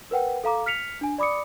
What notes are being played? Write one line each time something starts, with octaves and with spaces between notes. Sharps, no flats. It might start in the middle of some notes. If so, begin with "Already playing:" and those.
A#4 B4 F#5 G5
A4 F5 A#5 D6
F6 B6 C#7 F7
D4 G#5
D5 B5 D6 D#6 C#7